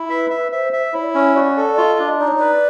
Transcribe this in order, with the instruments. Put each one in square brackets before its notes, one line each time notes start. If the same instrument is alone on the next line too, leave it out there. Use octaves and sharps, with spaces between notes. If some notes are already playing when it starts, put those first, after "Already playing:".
Already playing: [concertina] E4
[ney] B4 [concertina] E5
[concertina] E5
[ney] C5 [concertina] E5
[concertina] E5
[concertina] E4 [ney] C#5
[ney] D5
[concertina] C#4 [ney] C#5
[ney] C#5
[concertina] F#4 [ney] D5
[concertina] A4
[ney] D5
[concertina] F4 [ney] D#5
[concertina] D4
[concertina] D#4 [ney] D5
[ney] C#5
[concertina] B4 [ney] D5